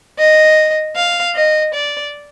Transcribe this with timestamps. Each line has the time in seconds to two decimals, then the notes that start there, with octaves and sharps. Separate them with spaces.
0.19 D#5
0.96 F5
1.35 D#5
1.74 D5